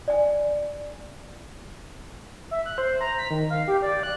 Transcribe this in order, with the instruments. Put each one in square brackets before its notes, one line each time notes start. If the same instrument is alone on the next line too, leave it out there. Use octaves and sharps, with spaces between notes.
[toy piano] D5 G#5
[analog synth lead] E5
F#6
C5
A#5
B6
D#3
F5
G4
D5
F#6